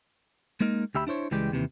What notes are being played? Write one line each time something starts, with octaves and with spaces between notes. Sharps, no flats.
G#3 A#3 D#4 A#4
D2 G4 E5 B5
D4 E4 C5 C#5
C#2 E3 G3 G#3 G4 G5
D#2 C3 E3